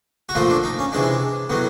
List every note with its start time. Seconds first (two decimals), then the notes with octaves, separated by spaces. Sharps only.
0.29 F#4
0.35 A#2 F3 A3 F4
0.50 D4
0.64 D#4
0.79 C#4
0.92 C3 E3 G#3 D4
1.50 A2 F#3 B3